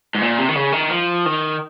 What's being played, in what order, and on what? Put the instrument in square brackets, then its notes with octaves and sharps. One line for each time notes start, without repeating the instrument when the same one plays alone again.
[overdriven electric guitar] G#2
A#2
C3
D#3
C#3
D#3
F3
D#3